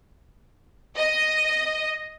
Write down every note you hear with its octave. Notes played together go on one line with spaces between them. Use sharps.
D#5